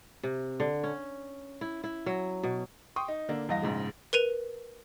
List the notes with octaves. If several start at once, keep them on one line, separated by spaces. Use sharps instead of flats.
C3
D3
C#4
E4
E4
F#3
B2
G5 C6 C#6 D#6
D#4
D3 A#3 D4
E2 G2 D#5 F5 A#6
A#1 G#2 C#3 G#3
A#4 B4 D#7 F7